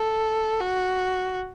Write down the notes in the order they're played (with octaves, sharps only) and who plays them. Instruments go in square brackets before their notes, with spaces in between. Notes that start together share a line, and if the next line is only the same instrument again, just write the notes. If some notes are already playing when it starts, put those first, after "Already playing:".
Already playing: [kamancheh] A4
F#4